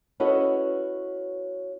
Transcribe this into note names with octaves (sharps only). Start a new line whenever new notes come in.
C#4 E4 F#4 A4 B4 D#5